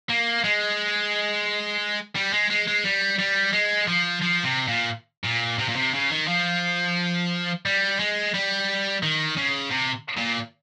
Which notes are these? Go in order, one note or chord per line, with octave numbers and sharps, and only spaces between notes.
A#3
G#3
G3
G#3
G#3
G#3
G3
G3
G#3
F3
F3
C3
A#2
A#2
C3
A#2
C3
C#3
D#3
F3
G3
G#3
G3
D#3
C#3
C3
A#2